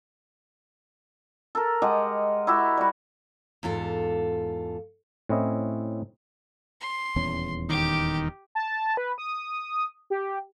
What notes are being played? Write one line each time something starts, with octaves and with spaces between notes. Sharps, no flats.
A4 A#4
G#3 G4 D#5 F#5
E4 F#4 G4 E5
G3 F#4
E2 G#2 F4 A4
A2 C4 C#4 E4 D#5
C6
D#1 E2 C#4
D#3 G4 D6
A5
B4
D#6
G4